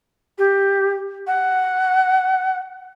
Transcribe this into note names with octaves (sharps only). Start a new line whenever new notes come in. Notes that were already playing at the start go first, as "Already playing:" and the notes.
G4
F#5